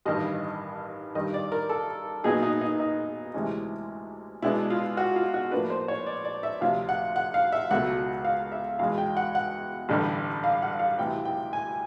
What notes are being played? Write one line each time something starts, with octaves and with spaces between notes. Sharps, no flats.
A1 G2 D#3 D#5
G2 D#3 G3 D#5
D5
A#4
A4
A#2 F#3 B3 D#4 G#4
D#4
D#4
D#4
D2 C3 E3 G#3 C#4
B2 G#3 B3 D4 E4
F4
F#4
F4
F#4
A2 F3 A#3 D4 B4
C5
C#5
D5
D5
E5
D2 C3 F3 F5
F#5
F#5
F5
E5
C#2 B2 F#3 A3 F#5
F5
E5
E2 B2 G#3 F5
G5
F#5
F#5
A1 G2 D3 G3
F5
F#5
F5
D2 C3 E3 G5
G5
G#5